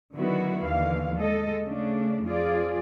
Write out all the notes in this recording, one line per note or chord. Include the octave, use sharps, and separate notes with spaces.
D3 D#3 F#3 B3 E4 F#4
D#2 D3 E3 F5
G#3 A4 D#5
C#3 A3 D4
F2 F3 F4 G#4 D5